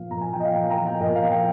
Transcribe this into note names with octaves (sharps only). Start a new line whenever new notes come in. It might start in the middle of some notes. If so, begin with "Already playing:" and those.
Already playing: A#2 F3 F5
A#2 A#5
G#5
F3 G5
D#5
F5
A#2 G5
A#5
F3
G5
A#2 D#5
F5
F3
G5